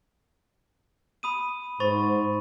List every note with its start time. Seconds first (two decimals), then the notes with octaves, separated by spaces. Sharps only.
1.23 B5 D#6 D#7
1.80 G#2 C5 B5 C#6 A6